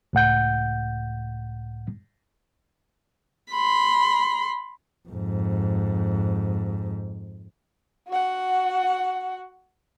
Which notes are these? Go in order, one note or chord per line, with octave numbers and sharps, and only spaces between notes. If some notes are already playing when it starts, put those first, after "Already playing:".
C#2 A2 F#5 G6
B5 C6
F2 G#2
F#4 F#5